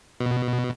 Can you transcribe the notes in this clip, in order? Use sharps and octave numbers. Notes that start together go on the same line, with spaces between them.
B2